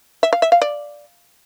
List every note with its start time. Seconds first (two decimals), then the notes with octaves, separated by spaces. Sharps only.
0.23 E5
0.33 F5
0.42 E5
0.52 F5
0.62 D5